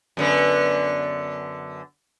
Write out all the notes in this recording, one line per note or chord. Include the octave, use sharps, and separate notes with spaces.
F#2 D3 B3